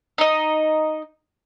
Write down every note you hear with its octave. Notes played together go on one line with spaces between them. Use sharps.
D#4 D#5